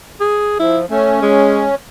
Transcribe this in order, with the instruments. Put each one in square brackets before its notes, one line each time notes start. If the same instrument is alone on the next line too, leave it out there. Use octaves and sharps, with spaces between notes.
[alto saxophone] G#4
[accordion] F3 [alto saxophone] E4
[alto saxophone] A3 [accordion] C#4
[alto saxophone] G#3